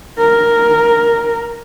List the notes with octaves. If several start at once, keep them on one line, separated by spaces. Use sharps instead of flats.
A#4